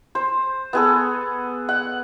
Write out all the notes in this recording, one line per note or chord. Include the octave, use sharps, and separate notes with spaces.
C5
B3 G#4 A4
F#5